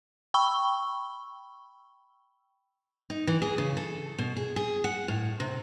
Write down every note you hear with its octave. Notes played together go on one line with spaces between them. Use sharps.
G5 B5 C#6 E6 G7
D#4
E3
G#4
C#3
A4
B2
G#4
G#4
F#5
A2
C3